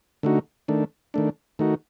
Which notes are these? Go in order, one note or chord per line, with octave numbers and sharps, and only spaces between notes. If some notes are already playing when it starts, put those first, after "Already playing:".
D3 A3 D#4 F#4
D#3 A3 D4
D#3 A3 D4
D#3 A3 D#4 F#4